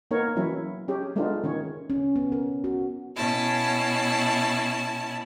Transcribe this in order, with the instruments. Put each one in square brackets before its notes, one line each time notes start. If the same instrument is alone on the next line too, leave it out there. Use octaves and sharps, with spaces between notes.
[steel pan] A#3 B3 D#4 A#4 C#5
E3 F#3 C#4 E4
C#4 G4 G#4
G#3 A3 B3 D4 D#4 F4
D#3 C#4 C#5
[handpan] C#4
B3
A#4
F#4
[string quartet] B2 C#4 E4 A5